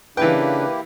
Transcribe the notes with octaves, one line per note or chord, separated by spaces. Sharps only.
C#3 E3 A#3 D4 E4 G4 B4 G5